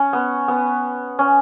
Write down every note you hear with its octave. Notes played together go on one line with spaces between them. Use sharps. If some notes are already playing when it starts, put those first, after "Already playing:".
Already playing: C#4
B3
B3
C#4